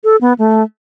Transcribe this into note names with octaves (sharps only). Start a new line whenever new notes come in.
A4
B3
A3